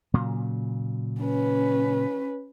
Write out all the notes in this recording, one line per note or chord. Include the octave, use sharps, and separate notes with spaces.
A#2 C#3 F#3
C#4 B4